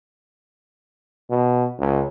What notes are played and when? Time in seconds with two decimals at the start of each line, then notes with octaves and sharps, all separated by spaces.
1.30 B2
1.79 C#2